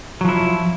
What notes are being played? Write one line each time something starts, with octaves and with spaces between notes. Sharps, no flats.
F3 F#3 E4